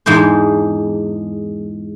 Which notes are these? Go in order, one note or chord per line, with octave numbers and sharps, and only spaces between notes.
E2 G#2 G#3 D4 C5